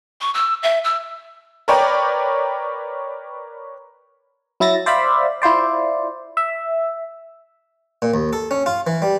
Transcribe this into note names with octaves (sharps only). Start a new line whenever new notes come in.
C#6
E6
E5
E6
A#4 B4 C#5 D5 G5 A#5
F#3 E4 E5 A6 A#6
C5 D5 E5 F5 B5
E4 F4 C5 D5
E5
A#2
D#2
A4
C#4
F4
E3
G3